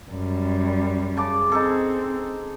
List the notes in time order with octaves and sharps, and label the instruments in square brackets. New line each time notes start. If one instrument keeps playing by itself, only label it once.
[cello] F#2 G3
[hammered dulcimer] C#3 A5 D6
[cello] C4 [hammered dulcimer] D#4 G#4 A4